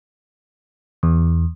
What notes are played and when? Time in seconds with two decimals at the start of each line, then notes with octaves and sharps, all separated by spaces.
1.03 E2